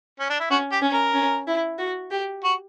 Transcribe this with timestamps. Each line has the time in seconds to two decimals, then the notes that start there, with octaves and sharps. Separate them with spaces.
0.19 C#4
0.29 D4
0.40 E4
0.50 C#4 F#4
0.72 G4
0.82 C#4
0.93 A#4
1.14 C#4
1.47 E4
1.78 F#4
2.11 G4
2.44 F#4